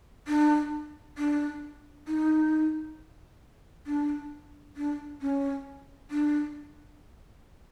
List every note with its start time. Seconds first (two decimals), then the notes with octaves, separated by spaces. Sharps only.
0.28 D4
1.18 D4
2.07 D#4
3.86 D4
4.77 D4
5.21 C#4
6.11 D4